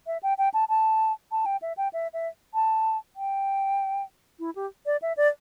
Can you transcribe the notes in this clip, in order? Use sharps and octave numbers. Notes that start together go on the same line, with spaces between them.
E5
G5
G5
A5
A5
A5
G5
E5
G5
E5
E5
A5
G5
E4
G4
D5
E5
D5